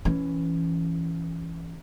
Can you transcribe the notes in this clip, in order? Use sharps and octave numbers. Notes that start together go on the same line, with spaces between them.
E3 C#4